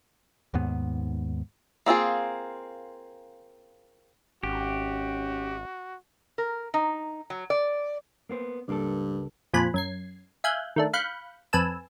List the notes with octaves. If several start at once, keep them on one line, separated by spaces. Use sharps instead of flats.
D#2 G#2 B3
A#3 C4 F4 G#4
G#1 C#4 F#4 G4
A#4
D#4
F#3
D5
A#3 B3 C5
C#2 G2 A#3 A4
F2 A#2 F3 G#5 B5 F#6
F#2 G#6 C7
E5 F5 G#5 F#6 G6
D#3 A3 D4
F5 B5 F#6 G6 C#7
F2 B4 G#5 A5 E6